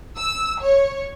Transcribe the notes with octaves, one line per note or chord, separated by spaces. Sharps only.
E6
C#5